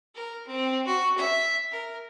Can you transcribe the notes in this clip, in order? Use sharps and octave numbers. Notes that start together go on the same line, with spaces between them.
A#4
C4
F#4
E5
A#4